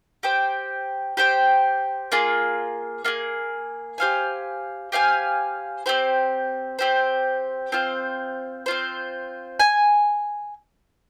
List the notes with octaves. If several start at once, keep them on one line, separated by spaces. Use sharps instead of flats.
G4 C5 G5
G4 C5 G5
A#3 F4 G#4
A#3 F4 G#4
G4 C5 F5 G#5
G4 C5 F5 G#5
C4 G4 C5
C4 G4 C5
C4 F4 C5
C4 F4 C5
G#5